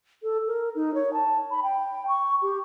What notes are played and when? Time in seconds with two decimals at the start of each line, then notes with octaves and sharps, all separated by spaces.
0.23 A4
0.47 A#4
0.75 D#4
0.94 C#5
1.13 A5
1.51 B5
1.63 G5
2.08 C#6
2.42 G4